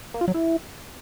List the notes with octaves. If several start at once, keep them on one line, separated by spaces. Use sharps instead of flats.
A#3
F4
F#3
E4